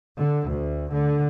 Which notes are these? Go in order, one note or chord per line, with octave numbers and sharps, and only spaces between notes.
D3
D2
D3